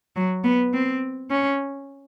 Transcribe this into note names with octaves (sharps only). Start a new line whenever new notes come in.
F#3
B3
C4
C#4